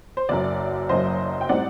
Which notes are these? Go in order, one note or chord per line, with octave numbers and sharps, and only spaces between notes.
C5
F#1 F#2 F#3 D5
F#1 F#2 F#3 C5 D#5
G5
A2 G3 C4 D#4 D5 F#5